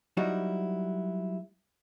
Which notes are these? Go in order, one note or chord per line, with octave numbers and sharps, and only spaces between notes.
F#3 G3 D#4 E4 F#4